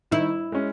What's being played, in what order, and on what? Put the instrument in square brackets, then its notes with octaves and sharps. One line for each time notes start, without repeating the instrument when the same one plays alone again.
[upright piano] D#3 [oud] E4
[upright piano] G#3 C#4